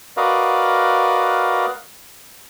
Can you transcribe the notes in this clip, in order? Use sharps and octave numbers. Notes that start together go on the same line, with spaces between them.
F#4 A#4 B4 D5 D#5 F5